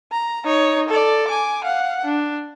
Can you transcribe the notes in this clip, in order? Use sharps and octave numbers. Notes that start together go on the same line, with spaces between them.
A#5
D#4 C#5
A4 D5
G#5 D6
F5 F#5
D4